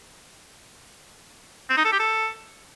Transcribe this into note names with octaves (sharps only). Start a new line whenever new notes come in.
C4
D#4
A4
G4
A4